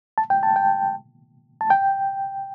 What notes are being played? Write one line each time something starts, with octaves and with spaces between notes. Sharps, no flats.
A5
G5
A5
G5
A5
G5